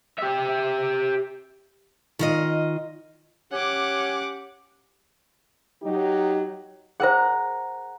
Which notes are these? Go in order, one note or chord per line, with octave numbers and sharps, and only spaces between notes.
G4 E5
D#3 F4 D#5
C#4 G4 F#5 D6
F#3 D#4 G4
G#4 A#4 C5 F#5 A#5